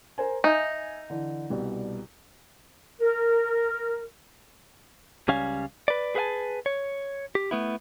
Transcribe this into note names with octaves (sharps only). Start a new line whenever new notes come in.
A#4 C5 G#5
D#4 E5 G#5 G6
D3 E3
C2 B2 G3
A#4
C#2 G3 C#4 F5 G#5
B4 D5
G#4 B4 C5 F5 G#5 A5
C#5
G4
A3 B3 E4